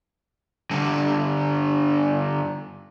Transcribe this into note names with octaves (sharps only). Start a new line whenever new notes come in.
G2 D3